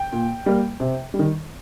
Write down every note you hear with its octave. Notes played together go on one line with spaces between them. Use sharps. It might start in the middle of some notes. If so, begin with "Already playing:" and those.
Already playing: G5
A#2
G3 A#3
C3
G3
D#3